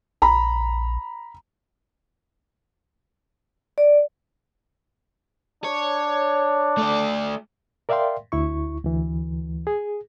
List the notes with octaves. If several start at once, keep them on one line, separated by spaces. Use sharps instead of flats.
A#1 A#5 B5
D5
D4 C#5
A3 D5
A#4 D5 E5 F5 G5 C6
D2 E4 C#6
D2 E3
G#4